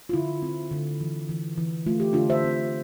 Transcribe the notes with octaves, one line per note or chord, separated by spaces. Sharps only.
F4
D3 E4
C4
D3
E3
E3
E3
A3 F4
G4
D3 D4 F4
C5 E5
C4